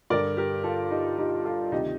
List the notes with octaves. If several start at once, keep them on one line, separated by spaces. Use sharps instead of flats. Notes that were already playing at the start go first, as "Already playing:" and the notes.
G2 D3 A#4 D5
G4 A#4
F4 A4
D#4 G4
D#4 G4
F4 A4
D2 C3 D#3 D#4 G4